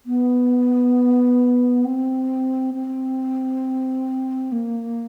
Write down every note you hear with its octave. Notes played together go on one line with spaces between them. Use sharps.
B3
C4
C4
A#3